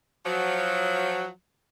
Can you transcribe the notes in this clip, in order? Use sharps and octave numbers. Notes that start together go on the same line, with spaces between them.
F3 F#3